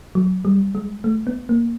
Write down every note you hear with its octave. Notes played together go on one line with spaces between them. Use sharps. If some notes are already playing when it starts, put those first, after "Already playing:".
F#3
G3
G#3
A3
B3
A#3